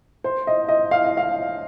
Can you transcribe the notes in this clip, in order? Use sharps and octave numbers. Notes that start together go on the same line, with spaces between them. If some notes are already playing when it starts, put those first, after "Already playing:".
C5
D#5
D#5
F5
D#5
F5